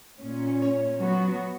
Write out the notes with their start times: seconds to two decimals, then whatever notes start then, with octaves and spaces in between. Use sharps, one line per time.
0.19 A#2 C#4
0.62 C#5
0.99 F#3 B3 F#4